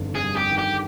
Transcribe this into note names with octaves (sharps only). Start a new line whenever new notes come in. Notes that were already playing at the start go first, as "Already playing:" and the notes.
Already playing: G1 F2 D#3 G3
G#4
G3
G4
D#3
G4